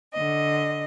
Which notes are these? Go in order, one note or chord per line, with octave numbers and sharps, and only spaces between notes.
D3 D#5